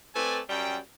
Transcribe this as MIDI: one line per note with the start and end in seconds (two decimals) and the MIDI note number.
0.15 0.40 57
0.15 0.40 60
0.15 0.40 69
0.15 0.40 71
0.15 0.40 74
0.15 0.40 80
0.49 0.78 42
0.49 0.78 55
0.49 0.78 79